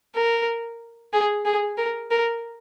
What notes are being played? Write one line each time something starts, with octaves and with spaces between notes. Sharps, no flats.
A#4
G#4
G#4
A#4
A#4